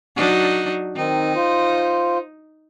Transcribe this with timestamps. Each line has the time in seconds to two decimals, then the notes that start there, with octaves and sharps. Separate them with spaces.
0.16 F#3 D4 D#4
0.96 D#3 C4 D#4
1.35 F4 C5